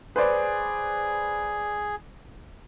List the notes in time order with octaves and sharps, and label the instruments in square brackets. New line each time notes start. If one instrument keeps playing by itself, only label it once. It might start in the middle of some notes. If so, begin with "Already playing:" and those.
[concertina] G#4 [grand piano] B4 C5 D5